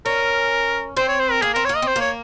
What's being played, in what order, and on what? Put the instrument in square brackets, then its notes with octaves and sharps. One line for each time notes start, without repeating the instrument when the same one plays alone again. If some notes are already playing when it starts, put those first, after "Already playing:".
[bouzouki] C#4 [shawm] A#4
[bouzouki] C4 [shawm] C5
[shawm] C#5
C5
A#4
[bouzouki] A#3 [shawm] G#4
[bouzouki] C4 [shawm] A#4
[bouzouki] A#3 [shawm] C#5
[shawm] D#5
[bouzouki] C4
[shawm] C5
[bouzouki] A#3
[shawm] C#5